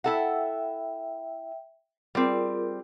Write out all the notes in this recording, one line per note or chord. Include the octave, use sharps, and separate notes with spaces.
E4 A4 E5 F#5 G5
G3 C4 F4 G#4 A#4